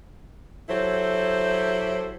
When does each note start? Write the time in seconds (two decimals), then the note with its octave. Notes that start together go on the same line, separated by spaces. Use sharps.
0.69 F#3 E4 G4 A4 C5